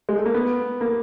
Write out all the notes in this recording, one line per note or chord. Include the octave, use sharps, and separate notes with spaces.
G#3
A3
A#3
B3
A#3